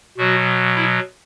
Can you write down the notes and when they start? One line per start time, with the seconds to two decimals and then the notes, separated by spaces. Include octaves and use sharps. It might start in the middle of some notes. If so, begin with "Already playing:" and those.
0.17 B2 F#3 F#4
0.76 E4